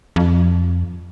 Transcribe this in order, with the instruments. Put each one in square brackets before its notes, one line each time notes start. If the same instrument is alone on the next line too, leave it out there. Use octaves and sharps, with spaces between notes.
[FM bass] F2